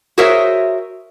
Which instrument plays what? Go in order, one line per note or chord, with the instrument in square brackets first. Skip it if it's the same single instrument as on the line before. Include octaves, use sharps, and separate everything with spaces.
[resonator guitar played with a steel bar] F#4 G#4 A#4 C5 C#5 E5